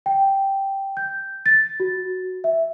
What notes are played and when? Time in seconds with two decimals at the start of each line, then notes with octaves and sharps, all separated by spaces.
0.06 G5
0.97 G6
1.46 A6
1.80 F#4
2.44 E5